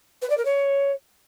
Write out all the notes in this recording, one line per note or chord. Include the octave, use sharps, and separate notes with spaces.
B4
D5
A#4
C#5